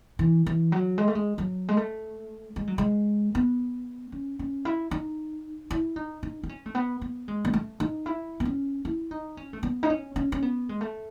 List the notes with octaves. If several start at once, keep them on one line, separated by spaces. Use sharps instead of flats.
E3
E3
F#3
G#3
A3
G#3
F#3
G#3
A3
G#3
F#3
G#3
B3
C#4
C#4
E4
D#4
E4
D#4
D#4
D#4
C#4
A3
B3
B3
G#3
B3
A3
D#4
E4
B3
C#4
E4
D#4
C#4
A3
B3
D#4
C#4
C#4
C#4
B3
G#3
A3